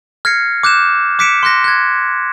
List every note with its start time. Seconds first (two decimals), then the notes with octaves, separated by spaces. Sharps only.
0.25 F6 G#6 A#6 C7 C#7
0.63 D6 F#6 G6 E7
1.19 D6 F#6 B6 C#7 D7 E7
1.43 C6 F6 F#6 A#6
1.64 F#6 G#6